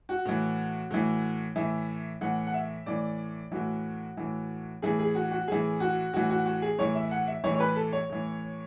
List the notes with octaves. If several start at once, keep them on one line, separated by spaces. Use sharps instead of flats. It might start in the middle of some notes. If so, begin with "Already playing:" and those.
F#4
A2 E3
A2 E3
A2 E3 E5
A2 E3 F#5
F#5
E5
A2 E3 D5
A2 E3 F#4
A2 E3
A2 E3 G#4
G#4
F#4
F#4
A2 E3 G#4
F#4
A2 E3 F#4
F#4
F#4
G#4
A2 E3 C#5
E5
F#5
E5
A2 E3 C#5
C#5
B4
A4
C#5
A2 E3